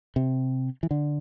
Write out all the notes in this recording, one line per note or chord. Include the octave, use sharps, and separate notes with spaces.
C3
E3
D3